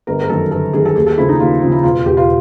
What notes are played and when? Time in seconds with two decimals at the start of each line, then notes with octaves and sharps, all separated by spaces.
0.07 G1 A#4
0.21 A#4
0.30 F#2 D#3 A4
0.51 G1 A4
0.73 F#2 D#3 G#4
0.85 A4
0.96 D#2 G#4
1.06 A4
1.18 C#3 F3 E4
1.29 D#4
1.40 D#2 F4
1.62 C#3 F3
1.72 E4
1.83 E1 F4
2.06 E2 B2 G4
2.17 F4